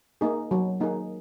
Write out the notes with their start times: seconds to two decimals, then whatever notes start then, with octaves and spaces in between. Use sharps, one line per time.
0.21 A#3 D#4 G#4
0.51 F#3
0.80 A#3 D#4 G#4